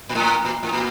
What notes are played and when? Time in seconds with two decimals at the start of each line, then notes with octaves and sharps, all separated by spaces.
0.09 A#2
0.15 A2
0.45 A#2
0.63 A2
0.73 A#2